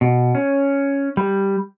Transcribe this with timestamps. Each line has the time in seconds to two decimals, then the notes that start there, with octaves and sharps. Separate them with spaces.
0.01 B2
0.35 C#4
1.17 G3